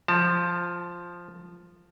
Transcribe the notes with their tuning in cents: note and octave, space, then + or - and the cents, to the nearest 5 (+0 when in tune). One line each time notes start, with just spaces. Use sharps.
F3 +0 A5 +30